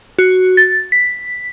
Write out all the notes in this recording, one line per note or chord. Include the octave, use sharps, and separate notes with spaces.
F#4
A6
B6